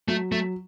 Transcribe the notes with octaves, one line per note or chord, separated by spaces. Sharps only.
F#3 A3
F#3 A3